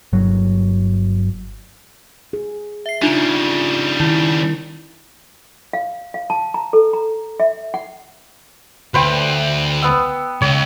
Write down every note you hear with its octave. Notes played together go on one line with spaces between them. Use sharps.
G1 F#3
G#4
E5 C7
C#3 G3 D4 D#4 F4 A#5
D#3 E4
F5
F5
A5
A#5
A4
A#5
E5
F#5
D2 B4 C5 G5
B3 E6
C#2 C#5